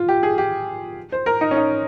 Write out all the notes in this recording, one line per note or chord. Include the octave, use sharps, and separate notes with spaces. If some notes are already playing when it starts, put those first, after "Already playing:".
Already playing: F4
G4
G#4
G4
C5
A#4
D#4
C#4
D#4